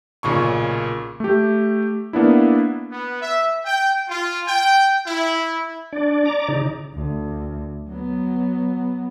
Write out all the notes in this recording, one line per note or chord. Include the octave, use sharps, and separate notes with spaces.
B1 A#2 C#3 C#6
A3 G4
A#3 B3 D4 E4
B3
E5
G5
F4
G5
E4
D4 D5
D5 A#5 D6
C#3 D#4
D2
F#3 B3